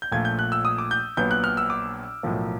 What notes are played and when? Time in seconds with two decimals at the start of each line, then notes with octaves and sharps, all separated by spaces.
0.02 G6
0.11 A#1 A#2 F3 A3 G#6
0.25 G6
0.39 F#6
0.52 E6
0.65 D#6
0.78 D6
0.91 G6
1.17 A#1 A#2 F#3 B3 G6
1.31 F#6
1.44 F6
1.57 E6
1.70 D6
2.23 B1 A2 F3 A#3